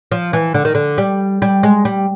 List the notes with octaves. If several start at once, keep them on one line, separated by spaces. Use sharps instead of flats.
F3
E3
D3
D#3
D3
G3
G3
G#3
G3